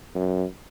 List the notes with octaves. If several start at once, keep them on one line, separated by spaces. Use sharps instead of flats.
F#2